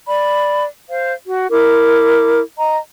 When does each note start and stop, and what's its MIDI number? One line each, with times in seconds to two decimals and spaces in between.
0.08 0.65 74
0.08 0.65 83
0.90 1.13 72
0.90 1.13 77
1.26 1.47 66
1.51 2.41 64
1.51 2.41 70
1.51 2.41 86
2.57 2.77 75
2.57 2.77 82